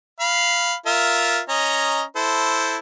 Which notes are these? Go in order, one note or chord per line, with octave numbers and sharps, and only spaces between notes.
F5 B5
F4 A#4 E5
C#4 D#5 A#5
E4 A4 C5